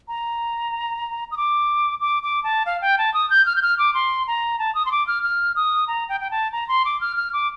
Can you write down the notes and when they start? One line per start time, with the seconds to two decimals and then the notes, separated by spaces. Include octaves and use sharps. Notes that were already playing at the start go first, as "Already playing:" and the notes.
0.08 A#5
1.31 D#6
1.37 D6
2.01 D6
2.23 D6
2.44 A5
2.66 F5
2.82 G5
2.98 A5
3.14 D#6
3.30 G6
3.46 F6
3.56 G6
3.62 F6
3.79 D6
3.94 C6
4.27 A#5
4.59 A5
4.75 D#6
4.86 C6
4.92 D6
5.07 F6
5.23 F6
5.56 D#6
5.88 A#5
6.09 G5
6.20 G5
6.31 A5
6.52 A#5
6.68 C6
6.85 D6
7.01 F6
7.17 F6
7.33 D6